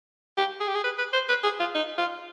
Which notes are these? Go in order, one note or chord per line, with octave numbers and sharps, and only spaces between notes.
G4
G#4
G4
G#4
B4
B4
C5
B4
G#4
F4
D#4
F4